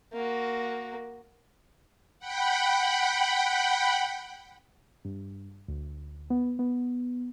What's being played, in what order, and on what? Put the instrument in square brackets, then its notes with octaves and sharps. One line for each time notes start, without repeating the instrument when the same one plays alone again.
[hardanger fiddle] A#3 F#4
[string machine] F#5 G5 B5
[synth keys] G2
D2
B3
B3